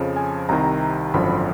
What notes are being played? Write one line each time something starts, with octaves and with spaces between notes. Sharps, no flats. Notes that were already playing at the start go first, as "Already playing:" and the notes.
Already playing: F2 C#3 F3
G#5
C2 C3 D#3 A#5
G#1 F#2 D3 F3 B5